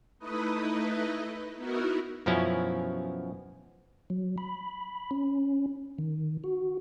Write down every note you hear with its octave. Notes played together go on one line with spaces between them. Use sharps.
A3 D#4 E4 B4 D#5
B3 D#4 E4 F#4 A#4
F#2 B2 F3 C#4 E4
F#3
B5
C#4
D#3
F#4